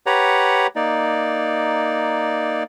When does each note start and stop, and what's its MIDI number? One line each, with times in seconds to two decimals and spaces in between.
0.06 0.67 67
0.06 0.67 71
0.06 0.67 73
0.06 0.67 78
0.06 0.67 82
0.76 2.63 58
0.76 2.63 63
0.76 2.63 74